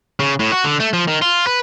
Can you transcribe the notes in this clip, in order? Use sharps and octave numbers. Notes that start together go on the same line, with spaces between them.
C#3
A2
F#4
D3
A3
F3
D#3
F4
B4